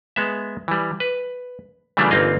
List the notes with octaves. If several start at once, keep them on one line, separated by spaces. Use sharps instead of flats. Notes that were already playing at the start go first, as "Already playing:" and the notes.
G#3 B3 E5
E3 G3
B4
C#3 E3 F#3 G3 A3 D4
G1 A#3 C4 D#4 F4 D#5